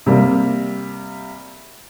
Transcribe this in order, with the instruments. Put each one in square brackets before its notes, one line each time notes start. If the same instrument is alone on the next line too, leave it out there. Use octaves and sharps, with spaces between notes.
[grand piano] C3 G3 A#3